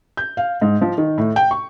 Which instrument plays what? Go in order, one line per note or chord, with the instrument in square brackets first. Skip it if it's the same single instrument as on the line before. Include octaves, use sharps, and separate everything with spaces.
[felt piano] G6
F5
G#2
F3
D#3
A2
G5
C#6